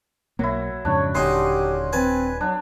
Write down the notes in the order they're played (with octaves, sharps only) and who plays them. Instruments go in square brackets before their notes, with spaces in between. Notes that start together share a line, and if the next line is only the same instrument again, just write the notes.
[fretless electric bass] B1 A#3 [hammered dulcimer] F#3 E4
[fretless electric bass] F2 G#2 C#3 [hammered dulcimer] D4 [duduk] C#5
[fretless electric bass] D#1 [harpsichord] D3 C#4 D#4 [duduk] G4 [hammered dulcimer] C6
[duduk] C4 [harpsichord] B4 A5 [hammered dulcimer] G#5
[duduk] F#3 [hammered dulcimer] D4